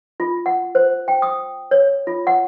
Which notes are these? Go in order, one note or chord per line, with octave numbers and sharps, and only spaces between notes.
F4
F#5
C5
G5
D#6
C#5
F4
F#5